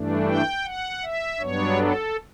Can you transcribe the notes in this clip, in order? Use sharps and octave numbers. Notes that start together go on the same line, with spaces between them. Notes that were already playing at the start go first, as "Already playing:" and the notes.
Already playing: G2 E3 A3 D4
G5
F#5
E5
G2 F#3 B3 D4 C#5
A4